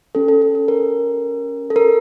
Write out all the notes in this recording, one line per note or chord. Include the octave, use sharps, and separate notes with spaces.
C#4 G4 A4
A4
A4
A4
A#4
A4
A#4